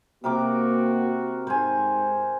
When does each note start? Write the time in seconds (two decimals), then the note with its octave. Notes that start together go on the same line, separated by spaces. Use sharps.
0.24 C3 A#3 F#4 A#4 D6
1.47 G#2 C5 G#5